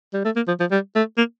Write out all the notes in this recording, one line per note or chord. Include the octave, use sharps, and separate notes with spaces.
G3
A3
A#3
F3
F3
G3
A3
A#3